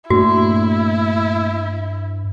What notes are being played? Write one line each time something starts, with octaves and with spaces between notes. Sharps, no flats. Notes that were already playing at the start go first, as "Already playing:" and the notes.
G2 A#2 A3 D4 E4 F#4